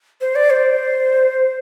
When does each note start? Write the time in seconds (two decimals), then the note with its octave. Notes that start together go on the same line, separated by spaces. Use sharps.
0.21 C5
0.36 D5
0.50 C5